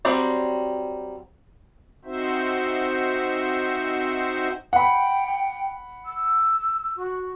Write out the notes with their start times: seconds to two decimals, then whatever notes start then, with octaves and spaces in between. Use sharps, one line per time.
0.05 F#3 G3 C4 C5
2.05 C4 D#4 F#4 C5 E5
4.73 F#5 G5 B5
6.05 E6
6.97 F#4